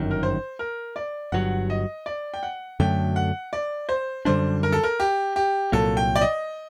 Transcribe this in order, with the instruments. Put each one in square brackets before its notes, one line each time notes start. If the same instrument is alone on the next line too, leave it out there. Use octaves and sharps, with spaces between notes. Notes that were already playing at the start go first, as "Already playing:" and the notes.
Already playing: [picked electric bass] G1 F#2 D#3
[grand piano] A#4
C5
A#4
D5
[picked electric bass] G1 G2 F#3 [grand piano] F#5
[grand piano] D#5
D5
G5
F#5
[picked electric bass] F#2 D3 F#3 A3 [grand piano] G5
[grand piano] F#5
D5
C5
[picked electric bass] F#2 D3 G3 D4 [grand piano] C5
[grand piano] A#4
A4
A#4
G4
G4
[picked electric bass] C2 A#2 F#3 A#3 [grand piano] A4
[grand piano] G5
D5
D#5